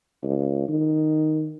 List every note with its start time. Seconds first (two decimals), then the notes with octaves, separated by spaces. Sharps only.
0.23 C#2
0.68 D#3